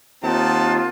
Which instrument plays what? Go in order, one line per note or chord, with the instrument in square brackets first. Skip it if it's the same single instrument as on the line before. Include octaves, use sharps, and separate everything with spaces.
[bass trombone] D#2 [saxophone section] C4 [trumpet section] D#4 F#5 A5 [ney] F4